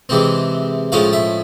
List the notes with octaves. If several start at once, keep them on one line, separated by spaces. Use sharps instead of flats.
C3 E3 G#3 C4
A2 F3 G#3 C#4 F5
E5